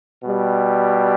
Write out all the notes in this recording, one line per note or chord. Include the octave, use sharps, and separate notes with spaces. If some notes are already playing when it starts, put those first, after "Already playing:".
B2 G3